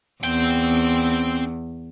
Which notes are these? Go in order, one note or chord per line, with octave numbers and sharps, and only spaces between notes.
E2 C4 G5